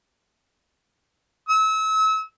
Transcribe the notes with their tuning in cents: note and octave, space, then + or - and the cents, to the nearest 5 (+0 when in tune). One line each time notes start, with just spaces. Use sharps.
E6 -35